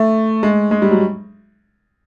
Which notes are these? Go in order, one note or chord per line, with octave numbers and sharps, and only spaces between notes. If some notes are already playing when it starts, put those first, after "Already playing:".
Already playing: A3
G#3
G#3
G3
F#3